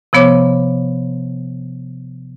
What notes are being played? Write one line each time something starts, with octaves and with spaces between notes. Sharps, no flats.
C3 F3 B3 C#5 D6